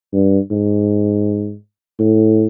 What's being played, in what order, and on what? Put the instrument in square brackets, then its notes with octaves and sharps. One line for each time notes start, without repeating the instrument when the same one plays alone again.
[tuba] G2
G#2
A2